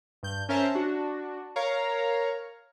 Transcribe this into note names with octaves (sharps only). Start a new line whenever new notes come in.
G2 G6
C#4 A#4 C5 E5 A5 A#5
D4 F#4
A#4 C#5 F5 A#5